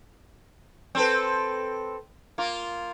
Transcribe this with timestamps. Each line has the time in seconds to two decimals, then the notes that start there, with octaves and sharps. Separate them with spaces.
0.95 C4 A4 B4
2.38 A#3 F4